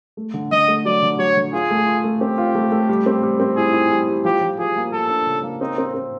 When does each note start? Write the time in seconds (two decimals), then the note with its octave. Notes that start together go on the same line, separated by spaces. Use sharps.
0.17 A3
0.34 D3
0.51 D3 D#5
0.68 A3
0.85 F#3 D5
1.02 D3
1.19 F#3 C#5
1.37 D3
1.53 F4 G#4
1.70 A3
1.86 F4
2.04 A3
2.21 C4 G4
2.38 F4
2.55 A3
2.72 A3
2.89 G3
3.06 C4
3.23 G3
3.40 C4
3.56 E4 G#4
3.73 E4
3.91 G3
4.08 G3
4.25 F3 G4
4.41 F3
4.59 F3 G#4
4.76 A#3
4.92 A#3 A4
5.09 D4
5.26 C#3
5.43 A#3
5.61 C4 D#4
5.78 C4
5.95 C4